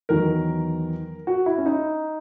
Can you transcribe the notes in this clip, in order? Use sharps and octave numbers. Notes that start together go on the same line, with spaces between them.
E2 D#3 F#3 A#4
F#4
E4
C#4
D#4